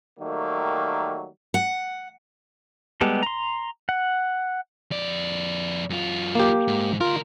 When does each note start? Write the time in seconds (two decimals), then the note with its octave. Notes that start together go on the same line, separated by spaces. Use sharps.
0.20 D#3 F#3 G3 A3 A#3
1.54 F#5
3.01 G3 G#3 B3 G4 A4
3.23 A#5 C6
3.89 F#5
4.91 F2 D5
5.90 F#2 F4
6.35 A#3 G4
6.68 G#2
7.01 D2 F4 A#4